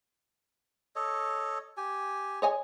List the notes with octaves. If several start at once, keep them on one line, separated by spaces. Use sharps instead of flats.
A4 C#5 D#5
G4 G#5
C#5 D#5 G#5